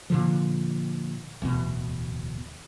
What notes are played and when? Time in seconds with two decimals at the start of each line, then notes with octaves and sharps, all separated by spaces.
0.10 A#2 D3 F3
1.42 D1 E2 B2